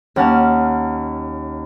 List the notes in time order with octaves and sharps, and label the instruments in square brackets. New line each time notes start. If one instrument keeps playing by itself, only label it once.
[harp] D#2 C#4 F#5 A5 F6